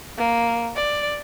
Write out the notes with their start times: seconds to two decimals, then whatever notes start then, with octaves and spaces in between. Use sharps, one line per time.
0.18 A#3
0.76 D5